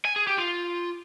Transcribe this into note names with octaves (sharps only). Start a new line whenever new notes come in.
G#5
G#4
G4
F4